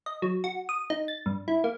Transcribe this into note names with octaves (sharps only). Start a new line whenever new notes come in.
D#5
F#3
F#4
D#6
D#4
A6
G2
E4
A#3